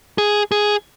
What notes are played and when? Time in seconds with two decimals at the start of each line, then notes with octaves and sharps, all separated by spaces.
0.18 G#4
0.52 G#4